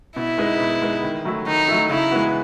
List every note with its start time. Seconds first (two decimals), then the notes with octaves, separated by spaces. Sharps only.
0.16 B2 E4
0.38 G#3 B3 D#4
0.60 B2
0.82 G#3 B3 D#4
1.03 D#3
1.25 F#3 A3 E4
1.46 D#3 D#4
1.68 F#3 A3 E4
1.89 C#3 E4
2.11 E3 G#3 B3 F#4